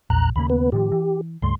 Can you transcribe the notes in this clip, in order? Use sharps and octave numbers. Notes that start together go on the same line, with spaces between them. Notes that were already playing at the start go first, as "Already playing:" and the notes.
A#1 E2 A#5 F#6
D#2 C#3 A#3 B5
B3 B4
A2 D#3 F3 G4
E3
C#2 G2 A3 C6